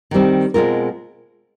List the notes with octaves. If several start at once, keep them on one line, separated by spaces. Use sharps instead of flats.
D#3 G3 C4
B2 G#3 C4 F4 A#4